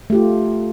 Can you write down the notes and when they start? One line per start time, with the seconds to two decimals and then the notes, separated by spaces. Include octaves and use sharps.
0.10 A3
0.12 G4
0.15 F4